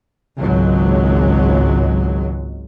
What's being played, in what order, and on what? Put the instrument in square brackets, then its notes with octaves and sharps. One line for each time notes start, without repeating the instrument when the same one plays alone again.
[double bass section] G#1 C#2 F#3 G#3